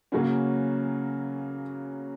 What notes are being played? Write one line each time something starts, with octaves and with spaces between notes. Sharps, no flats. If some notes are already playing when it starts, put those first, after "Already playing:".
C#3 F#3 A#3 C#4